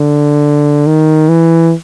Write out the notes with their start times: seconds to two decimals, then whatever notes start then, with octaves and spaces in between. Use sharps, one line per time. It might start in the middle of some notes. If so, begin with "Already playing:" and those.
Already playing: D3
0.86 D#3
1.29 E3